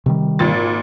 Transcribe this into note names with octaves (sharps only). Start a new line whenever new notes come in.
C3 D#3 G3
G#1 A#2 A6